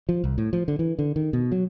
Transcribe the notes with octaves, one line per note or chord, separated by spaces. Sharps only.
F3
C2
A2
F3
D3
E3
D3
D#3
B2
F#3